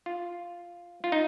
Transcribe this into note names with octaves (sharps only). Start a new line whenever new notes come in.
F4
F4
D#4